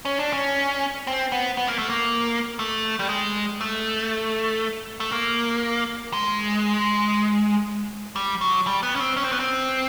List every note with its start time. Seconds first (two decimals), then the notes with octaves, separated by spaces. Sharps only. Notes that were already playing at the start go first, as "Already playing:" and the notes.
0.05 C#4
0.20 D4
0.33 C#4
1.07 C4
1.32 B3
1.57 B3
1.68 A#3
1.79 A3
1.90 A#3
2.59 A3
2.99 G3
3.09 G#3
3.61 A3
5.00 A3
5.12 A#3
6.13 G#3
8.16 G3
8.41 F#3
8.67 G3
8.83 B3
8.96 C#4
9.00 C4
9.17 C#4
9.24 C4
9.32 B3
9.40 C4